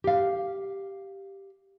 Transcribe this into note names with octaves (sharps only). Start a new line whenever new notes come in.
G4 F5